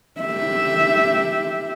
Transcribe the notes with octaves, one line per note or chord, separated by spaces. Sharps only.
G4 E5